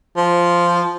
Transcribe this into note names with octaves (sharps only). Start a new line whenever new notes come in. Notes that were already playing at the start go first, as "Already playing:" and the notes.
F3